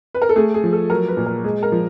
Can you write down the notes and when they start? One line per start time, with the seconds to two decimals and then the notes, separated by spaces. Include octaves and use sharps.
0.15 B4
0.22 A#4
0.29 A4
0.36 A3 G#4
0.54 G#4
0.64 F3
0.73 A4
0.90 F#3 A#4
1.08 B4
1.17 A#2
1.26 A#4
1.44 G#3 G#4
1.63 A#4
1.72 F3